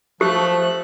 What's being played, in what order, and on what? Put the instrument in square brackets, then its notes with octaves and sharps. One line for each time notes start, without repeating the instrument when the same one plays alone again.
[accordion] F3 F#6 [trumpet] A3 [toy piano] G4